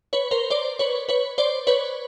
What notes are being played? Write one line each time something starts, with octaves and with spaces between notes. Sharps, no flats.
B4 C#5
A#4 C5
C5 D5
B4 C#5
B4 C#5
C5 D5
B4 C#5